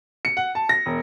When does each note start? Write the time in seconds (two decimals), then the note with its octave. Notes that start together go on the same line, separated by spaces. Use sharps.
0.25 C#7
0.37 F#5
0.55 A5
0.69 A#6
0.86 E1